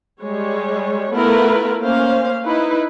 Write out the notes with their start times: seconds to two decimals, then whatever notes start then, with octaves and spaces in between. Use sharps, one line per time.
0.21 G3 G#3 C#5
1.13 A3 B3 E4 F4 A#4 B4
1.80 A#3 C#4 C5 F5
2.45 D#4 E4 B4